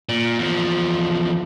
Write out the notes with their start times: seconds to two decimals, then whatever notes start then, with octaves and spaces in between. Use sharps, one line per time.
0.09 A#2
0.39 E2 F3